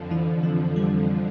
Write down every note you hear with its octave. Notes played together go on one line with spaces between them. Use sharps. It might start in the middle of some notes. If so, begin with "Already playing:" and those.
Already playing: F2 D3 F3
E3
F3
G3